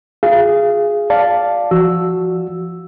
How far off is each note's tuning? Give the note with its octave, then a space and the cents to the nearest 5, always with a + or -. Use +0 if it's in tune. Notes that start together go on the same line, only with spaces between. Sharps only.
F4 +45 G#4 +0 F5 -30
D5 +0 F5 +0 A5 -5
F3 -30 F#4 +0 E6 +0